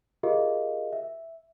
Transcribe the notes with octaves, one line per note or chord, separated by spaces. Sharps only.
F4 G4 G#4 A#4 D#5 F5
E5